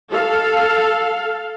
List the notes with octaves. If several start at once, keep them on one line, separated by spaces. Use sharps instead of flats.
A4 F5